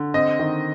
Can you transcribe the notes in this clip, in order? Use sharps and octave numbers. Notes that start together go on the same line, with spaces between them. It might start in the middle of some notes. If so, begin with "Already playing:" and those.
Already playing: D3
C4 D#5
D#3